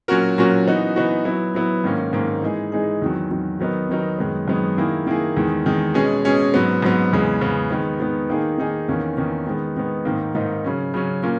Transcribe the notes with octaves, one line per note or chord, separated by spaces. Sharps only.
A#2 F#3 C#4 F#4 A#4
A#2 F#3 C#4 F#4 A#4
E3 B3 D#4 F#4
E3 B3 D#4 F#4
F#3 B3 E4
F#3 B3 E4
G#2 D#3 A#3 C#4
G#2 D#3 A#3 C#4
E3 G#3 D#4 G#4
E3 G#3 D#4 G#4
E2 D#3 F#3
E2 D#3 F#3
D#3 F#3 B3 D#4 A#4
D#3 F#3 B3 D#4 A#4
F#2 D#3 G#3 B3
F#2 D#3 G#3 B3
D#3 A#3 E4 G#4
D#3 A#3 E4 G#4
E2 D#3 G#3
E2 D#3 G#3
B2 G#3 C#4 G#4
B2 G#3 C#4 G#4
G#2 F#3 B3
G#2 F#3 B3
E2 C#3 G#3 B3
E2 C#3 G#3 B3
D#3 G#3 B3
D#3 G#3 B3
D#3 A#3 D#4 G#4
D#3 A#3 D#4 G#4
E2 D#3 A#3 C#4
E2 D#3 A#3 C#4
D#3 G#3 B3
D#3 G#3 B3
G#2 D#3 A#3 D#4
G#2 D#3 A#3 D#4
C#3 F#3 C#4
C#3 F#3 C#4
A#2 A#3 C#4